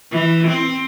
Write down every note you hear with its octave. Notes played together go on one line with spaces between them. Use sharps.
E3
C4